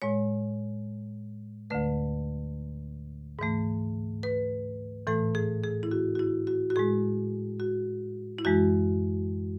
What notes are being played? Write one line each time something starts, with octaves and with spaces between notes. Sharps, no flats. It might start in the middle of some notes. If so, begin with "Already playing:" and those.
A2 G#3 C#5
D2 D3 A3 B4
G#2 E3 A3
B4
A2 E3 A3 A4
G#4
G#4
E4
F#4
F#4
E4
F#4
F#4
A2 G#3 G#4
F#4
E4
F#2 E3 G#3 F#4